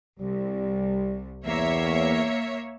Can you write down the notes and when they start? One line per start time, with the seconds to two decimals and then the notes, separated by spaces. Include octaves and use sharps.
0.19 C2 G3
1.46 E2 A#3 C#5 E5